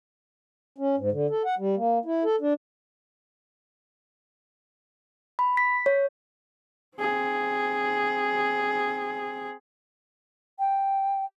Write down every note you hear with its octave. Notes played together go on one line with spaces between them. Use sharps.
C#4
G#2
D3
A4
F#5
G3
A#3
E4
A4
D4
B5
B6
C#5
C4 G#4
G5